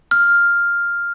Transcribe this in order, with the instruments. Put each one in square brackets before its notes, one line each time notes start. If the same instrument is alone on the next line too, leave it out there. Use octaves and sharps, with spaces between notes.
[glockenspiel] F6